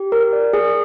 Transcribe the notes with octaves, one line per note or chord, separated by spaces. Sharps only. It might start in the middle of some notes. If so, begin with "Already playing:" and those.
Already playing: G4
A#4
D5
G#4